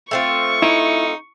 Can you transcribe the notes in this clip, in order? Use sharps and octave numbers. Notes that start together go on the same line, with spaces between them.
A3 C4 F4 C#6
D#4 E4